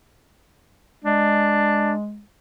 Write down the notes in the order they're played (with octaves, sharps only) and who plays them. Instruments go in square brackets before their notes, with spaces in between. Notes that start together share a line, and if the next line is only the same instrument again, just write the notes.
[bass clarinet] G#3 [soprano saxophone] D4